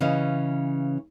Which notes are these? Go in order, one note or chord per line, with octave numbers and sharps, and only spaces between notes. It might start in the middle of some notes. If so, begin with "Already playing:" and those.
C#3 E3 C#4 D#5 F5